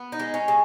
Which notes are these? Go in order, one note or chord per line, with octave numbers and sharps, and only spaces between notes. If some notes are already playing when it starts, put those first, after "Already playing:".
Already playing: B3
D#4
G#3
C#4
C#3